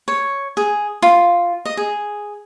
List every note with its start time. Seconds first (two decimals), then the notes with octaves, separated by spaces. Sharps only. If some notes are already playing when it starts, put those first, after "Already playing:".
0.08 C#5
0.57 G#4
1.02 F4
1.65 D#5
1.77 G#4